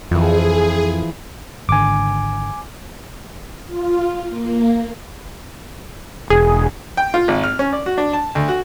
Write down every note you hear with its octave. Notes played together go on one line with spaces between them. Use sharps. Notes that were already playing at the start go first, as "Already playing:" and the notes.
F2 E3 F3 G#4
G#1 D3 G#5 D6
F4
A#3
E1 G#4
G5
F4
G#1
F6
C#4
D5
F#4
D4
A5
D2
F#4